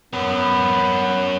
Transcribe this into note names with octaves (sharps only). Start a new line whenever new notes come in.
B3 C#4 A#4